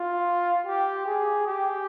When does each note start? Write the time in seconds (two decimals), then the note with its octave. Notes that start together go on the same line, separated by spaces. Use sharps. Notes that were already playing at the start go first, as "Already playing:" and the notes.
Already playing: F4
0.66 G4
1.06 G#4
1.46 G4